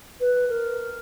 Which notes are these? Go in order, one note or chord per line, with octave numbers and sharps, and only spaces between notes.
B4
A#4